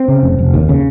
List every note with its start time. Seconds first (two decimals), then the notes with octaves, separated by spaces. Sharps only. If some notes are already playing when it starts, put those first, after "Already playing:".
Already playing: C4
0.08 C#3
0.23 F1
0.39 F1
0.54 D#2
0.69 C#3